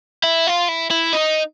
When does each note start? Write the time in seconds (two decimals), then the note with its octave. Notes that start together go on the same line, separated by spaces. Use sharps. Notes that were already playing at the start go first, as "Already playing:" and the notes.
0.24 E4
0.47 F4
0.68 E4
0.91 E4
1.13 D#4